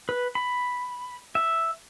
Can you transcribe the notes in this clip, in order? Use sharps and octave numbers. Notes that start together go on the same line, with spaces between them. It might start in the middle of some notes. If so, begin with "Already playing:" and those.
B4
B5
E5